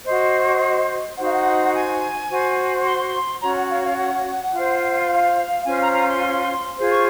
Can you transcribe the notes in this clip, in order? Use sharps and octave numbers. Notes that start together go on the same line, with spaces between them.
F#4 C5 D#5
D#4 F#4 C5 F#5
F5
F#5
G#5
F#4 C5
C6
C#4 F#4 C#5 A#5
F#5
F5
F5
F#5
F4 C5
F5
C#4 F4 C5 G#5
A#5
A#5
C6
F4 G#4 C5
C#6